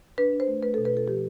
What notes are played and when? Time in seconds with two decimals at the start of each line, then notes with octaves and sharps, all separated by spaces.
0.18 D4 B4
0.33 D4
0.40 C5
0.48 A3
0.63 A3 B4
0.74 B2 A4
0.85 B4
0.93 F4 A4
1.08 F3 G4